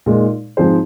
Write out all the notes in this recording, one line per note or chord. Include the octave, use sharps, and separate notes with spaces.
A#2 G#3 D#4
G#2 F3 C4 G#4 C5